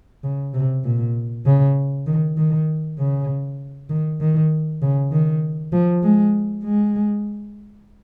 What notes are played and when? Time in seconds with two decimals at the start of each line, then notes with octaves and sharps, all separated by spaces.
0.24 C#3
0.54 C3
0.84 A#2
1.46 C#3
2.07 D#3
2.37 D#3
2.99 C#3
3.90 D#3
4.20 D#3
4.82 C#3
5.12 D#3
5.73 F3
6.03 G#3
6.64 G#3